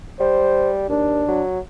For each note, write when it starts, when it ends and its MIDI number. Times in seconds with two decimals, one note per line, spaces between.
0.20 0.87 55
0.20 0.72 72
0.89 1.23 39
0.89 1.44 62
1.28 1.60 54